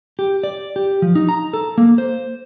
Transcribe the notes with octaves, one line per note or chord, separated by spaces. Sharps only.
G4
D5
G4
F3
D#4
A#5
A4
A#3
C5